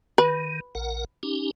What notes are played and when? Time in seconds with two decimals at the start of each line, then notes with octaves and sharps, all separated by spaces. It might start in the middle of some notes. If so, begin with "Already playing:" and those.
0.18 D#3 B4
0.75 A#1 A#4 F#5
1.23 C#4 D#4 G4